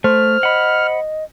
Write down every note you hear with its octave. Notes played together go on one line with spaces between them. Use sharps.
A3 C5 F6
D#5 F#5 B5